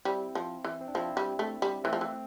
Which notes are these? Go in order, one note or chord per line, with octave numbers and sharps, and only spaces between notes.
G3 C4 E4
F3
E3
C4
D4
F3 C4 E4
G3
A3
G3
E3 A3 C4
F3
E3